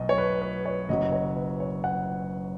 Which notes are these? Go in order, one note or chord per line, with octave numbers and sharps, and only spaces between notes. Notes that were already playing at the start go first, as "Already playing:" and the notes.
Already playing: B1 B2 D#5
C#5
B4
B4
C#5
F#1 F#2 F#3 D#5
C#5
B4
C#5
F#5